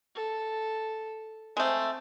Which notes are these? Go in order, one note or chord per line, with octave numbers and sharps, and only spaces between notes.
A4
G#3 A3 C4 C5